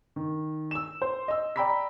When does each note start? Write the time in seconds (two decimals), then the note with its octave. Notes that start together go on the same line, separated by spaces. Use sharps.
0.16 D#3
0.71 E6 E7
1.02 C5
1.28 D#5 E6
1.56 D5 G5 A#5 B5 E6 B6